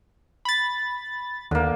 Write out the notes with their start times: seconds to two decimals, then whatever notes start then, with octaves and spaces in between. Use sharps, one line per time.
0.45 B5 A6
1.51 D#2 D3 A#3